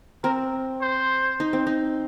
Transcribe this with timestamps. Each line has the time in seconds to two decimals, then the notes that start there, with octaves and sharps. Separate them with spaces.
0.24 C4 A#4
0.82 C5
1.40 D#4
1.53 C4
1.67 D#4